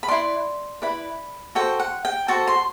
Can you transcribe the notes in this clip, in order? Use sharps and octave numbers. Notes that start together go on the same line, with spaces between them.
B5
E4 B4 D5 C6
E4 B4 D5 B5
F#4 A4 C5 G5
F#5
G5
F#4 A4 C5 A5
C6